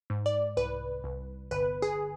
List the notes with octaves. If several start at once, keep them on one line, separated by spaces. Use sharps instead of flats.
G#2
D5
C2 B4
C2
G1 B4
G#4